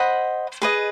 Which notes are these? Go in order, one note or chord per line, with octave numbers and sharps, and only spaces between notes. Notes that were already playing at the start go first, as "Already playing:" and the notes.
Already playing: C5 D#5 F#5 B5
G#4 B4 D#5